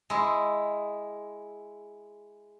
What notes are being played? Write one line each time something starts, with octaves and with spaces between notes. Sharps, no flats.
G#3 E4